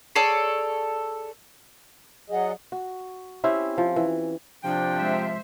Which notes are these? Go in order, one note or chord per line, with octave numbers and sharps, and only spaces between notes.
G#4 A4 C#5 D5
F#3 G#4 D5 D#5 F#5
F#4
C4 C#4 E4 G4
F3
E3
C3 F3 D4 G5
G#3 C5 E5